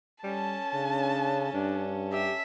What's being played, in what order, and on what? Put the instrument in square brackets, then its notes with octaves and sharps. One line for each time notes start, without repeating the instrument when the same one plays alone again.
[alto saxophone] G3 [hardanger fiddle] C#4 A4 [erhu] A5
[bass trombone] C#3 [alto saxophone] D4
[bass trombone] G2 [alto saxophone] D4
[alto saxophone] G4 [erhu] E5